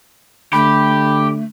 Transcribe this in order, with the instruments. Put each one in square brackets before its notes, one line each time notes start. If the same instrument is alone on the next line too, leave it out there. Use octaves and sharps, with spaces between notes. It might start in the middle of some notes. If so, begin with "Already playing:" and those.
[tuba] D3 [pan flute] A3 [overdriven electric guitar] G4 [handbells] B5